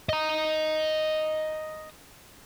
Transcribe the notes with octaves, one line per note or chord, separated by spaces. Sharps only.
D#5 A#5